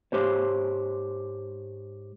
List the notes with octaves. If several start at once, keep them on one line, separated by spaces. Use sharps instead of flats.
G#2 G4 C5 C#5